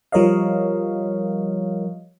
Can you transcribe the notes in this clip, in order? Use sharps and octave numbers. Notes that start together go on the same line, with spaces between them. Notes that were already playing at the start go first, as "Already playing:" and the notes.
F3 G3 A#4 C#5 D#5 F5